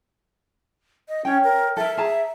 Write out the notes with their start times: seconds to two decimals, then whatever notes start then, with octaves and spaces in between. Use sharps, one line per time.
1.08 D#5
1.25 C#4 C#5 G5
1.44 A#4
1.77 A4 A#4 E5
1.97 G#4 A5 A#5